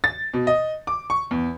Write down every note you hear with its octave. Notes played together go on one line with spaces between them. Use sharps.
A6
B2
D#5
D6
C#6
E2